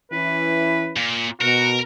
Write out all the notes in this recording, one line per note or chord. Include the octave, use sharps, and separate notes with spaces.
E3 C#4 E4 B4
A#2
B2 F#4 A#4